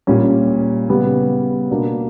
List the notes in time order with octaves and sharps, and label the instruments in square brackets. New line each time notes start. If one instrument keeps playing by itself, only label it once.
[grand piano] A#2 G3 C#4
C#3 G3 B3
B2 A#3 D4